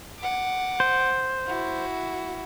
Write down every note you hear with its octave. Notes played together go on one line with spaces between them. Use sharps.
F#5 D6
C5
E4 F#4